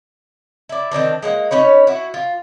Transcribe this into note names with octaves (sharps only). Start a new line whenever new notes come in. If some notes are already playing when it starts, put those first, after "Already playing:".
E4 D5
D#3 E3 C4 D4
G#3 A#3 F#5
C#4 D#4 B4 C#5
E4 F#4
F4